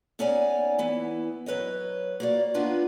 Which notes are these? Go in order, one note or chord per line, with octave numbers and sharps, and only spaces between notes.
B3 C#4 D#4 C#5 D5 G#5
E3 B3 E4
F#3 B4 C#5 D#5
A#3 F#4 D5
A#3 B3 D4 D#4 F4 B4